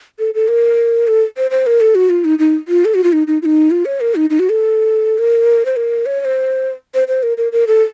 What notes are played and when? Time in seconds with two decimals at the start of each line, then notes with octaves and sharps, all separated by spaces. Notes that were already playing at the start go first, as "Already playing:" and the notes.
0.19 A4
0.34 A4
0.48 A#4
1.07 A4
1.37 C5
1.51 C5
1.67 A#4
1.80 A4
1.95 F#4
2.10 F4
2.25 D#4
2.39 D#4
2.68 F4
2.85 A4
2.95 F#4
3.04 F4
3.13 D#4
3.27 D#4
3.42 F4
3.45 D#4
3.71 F4
3.85 C#5
4.00 A#4
4.15 D#4
4.30 D#4
4.39 F#4
4.49 A4
5.18 A#4
5.65 C5
5.76 A#4
6.06 C#5
6.20 C#5
6.25 C5
6.94 C5
7.08 C5
7.23 A#4
7.37 A#4
7.52 A#4
7.67 A4